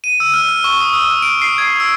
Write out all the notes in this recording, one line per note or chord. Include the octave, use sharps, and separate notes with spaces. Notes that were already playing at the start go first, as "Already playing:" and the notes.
D#7
E6
F6
F6
C#6
D#6
E6
D7
C7
G#6
E6